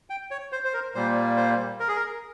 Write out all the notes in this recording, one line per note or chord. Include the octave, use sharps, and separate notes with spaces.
G5
C#5
C5
C5
A#4
A#2 G3 A#3 C5
C5
A#4
G#4
A#4